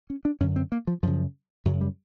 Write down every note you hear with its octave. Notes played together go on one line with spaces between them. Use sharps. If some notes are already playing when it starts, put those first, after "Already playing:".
C#4
D4
F#2 D3 C#4
C4
A#3
F3
F#2 C#3 F3
F#2 C#3 F#3
G3